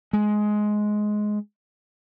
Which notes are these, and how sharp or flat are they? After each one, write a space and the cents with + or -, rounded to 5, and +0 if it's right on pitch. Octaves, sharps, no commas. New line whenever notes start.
G#3 +15